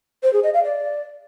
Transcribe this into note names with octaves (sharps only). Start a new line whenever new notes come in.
C5
G#4
D#5
F5
D5